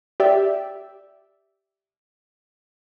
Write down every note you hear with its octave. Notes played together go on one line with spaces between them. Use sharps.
G4 D5 E5